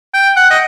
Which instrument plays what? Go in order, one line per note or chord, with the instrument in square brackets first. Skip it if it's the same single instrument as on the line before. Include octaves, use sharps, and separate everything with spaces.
[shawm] G5
F#5
D#5